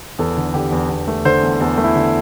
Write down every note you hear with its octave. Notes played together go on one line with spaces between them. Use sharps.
E2 A4
D3
D3 G4
E2
E2
A3
D3 C5
E2
E2 A4
A3
E4
D3